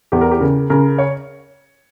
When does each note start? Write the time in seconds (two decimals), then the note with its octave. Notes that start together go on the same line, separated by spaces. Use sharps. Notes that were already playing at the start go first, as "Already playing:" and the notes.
0.12 E2 G4
0.21 A#4
0.31 G4
0.41 C#3 A#4
0.70 C#3 A#4
0.98 C#5